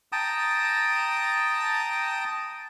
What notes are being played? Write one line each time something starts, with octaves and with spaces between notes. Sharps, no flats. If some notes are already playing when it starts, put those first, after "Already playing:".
G5 A5 A#5 D#6